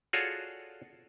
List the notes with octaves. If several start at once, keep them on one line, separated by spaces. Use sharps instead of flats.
F4 F#4 G#4 A4 C#5 D5